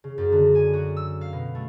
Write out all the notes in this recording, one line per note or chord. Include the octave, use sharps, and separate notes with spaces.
C#3
F#2
D3
G#5
F#4
E6
F5
B2
A3